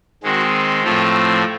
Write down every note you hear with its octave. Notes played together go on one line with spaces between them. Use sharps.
D#3 G#3 C4 F#4
A2 F3 A3 C4 F4